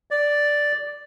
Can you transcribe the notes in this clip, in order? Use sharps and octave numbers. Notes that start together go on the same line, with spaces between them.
D5